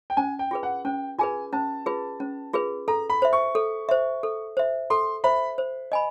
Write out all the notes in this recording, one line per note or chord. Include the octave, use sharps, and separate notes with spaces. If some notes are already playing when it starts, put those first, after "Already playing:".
G5
C#4 G#5
G5
F4 G#4 B4
F#5
C#4 G5
F4 G#4 B4 G#5
C#4 A5
F4 G#4 B4
C#4
F4 G#4 B4
A4 A#5
B5
C5 E5
C#6
A4
C5 E5
A4
C5 E5
A4 C6
C5 E5 B5
C5
D#5 G#5 B5